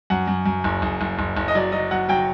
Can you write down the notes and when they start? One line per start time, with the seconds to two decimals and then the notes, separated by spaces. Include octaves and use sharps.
0.10 F#2 F#5
0.27 F#2
0.46 F#2
0.64 F#1
0.82 F#1
1.01 F#1
1.19 F#1
1.37 F#1
1.48 D#5
1.55 F#3 D5
1.72 F#3 D#5
1.91 F#3 F#5
2.09 F#3 G5